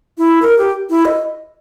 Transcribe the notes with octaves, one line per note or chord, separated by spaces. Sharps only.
E4
A#4
G4
E4
D#5